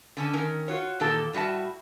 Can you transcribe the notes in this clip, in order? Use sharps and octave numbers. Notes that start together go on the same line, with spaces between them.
D3 C#4 A5
D#3 C#4 A#4
F4 F#4 C#5
E2 A#2 D#3 G4 A4 A5
A2 G3 F#4 E5 A5